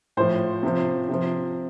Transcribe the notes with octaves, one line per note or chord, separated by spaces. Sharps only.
A2 F3 C5
C3 F3
C3 F3